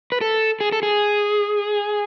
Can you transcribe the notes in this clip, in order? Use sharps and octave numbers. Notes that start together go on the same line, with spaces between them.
B4
A4
G#4
A4
G#4